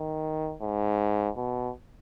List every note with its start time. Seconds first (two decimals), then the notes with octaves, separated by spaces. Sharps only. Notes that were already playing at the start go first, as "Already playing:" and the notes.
Already playing: D#3
0.62 G#2
1.37 B2